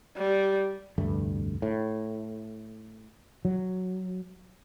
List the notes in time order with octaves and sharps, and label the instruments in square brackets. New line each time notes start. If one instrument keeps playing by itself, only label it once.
[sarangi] G3
[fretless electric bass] F1 D2 G2 A3
A2
F#3